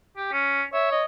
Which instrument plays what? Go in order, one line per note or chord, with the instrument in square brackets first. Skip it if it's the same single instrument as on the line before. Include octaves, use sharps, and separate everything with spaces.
[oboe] G4
C#4
[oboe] C#5 [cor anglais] E5
[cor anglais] D#5